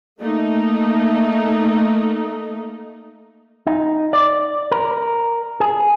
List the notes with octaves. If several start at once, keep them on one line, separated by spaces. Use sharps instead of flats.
A3 A#3 D#4
D#4
D5
A#4
G#4